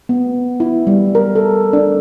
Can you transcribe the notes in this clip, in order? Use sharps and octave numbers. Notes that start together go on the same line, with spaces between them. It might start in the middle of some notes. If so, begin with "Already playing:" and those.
B3
E4
G3
A#4
A4
D4